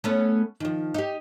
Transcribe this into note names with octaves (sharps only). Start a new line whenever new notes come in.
A3 B3 C#4
D#3 F3
D#4 G4